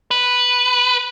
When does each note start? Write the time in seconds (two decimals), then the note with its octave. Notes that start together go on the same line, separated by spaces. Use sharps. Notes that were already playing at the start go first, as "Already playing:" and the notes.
0.11 B4